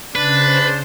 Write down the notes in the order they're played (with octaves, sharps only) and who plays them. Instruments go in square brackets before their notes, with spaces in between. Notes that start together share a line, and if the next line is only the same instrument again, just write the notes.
[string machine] C#3 C5 [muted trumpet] D4 [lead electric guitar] B4